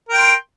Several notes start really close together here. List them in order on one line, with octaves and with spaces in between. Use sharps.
A#4 G5 C6